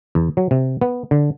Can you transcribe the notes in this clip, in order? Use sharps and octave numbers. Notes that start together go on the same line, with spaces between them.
E2
F#3
C3
B3
D3